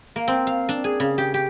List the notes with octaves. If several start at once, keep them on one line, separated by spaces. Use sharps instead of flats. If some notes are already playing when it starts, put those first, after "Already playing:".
A#3
C4
F5
D4
G#4
C#3
G4
G4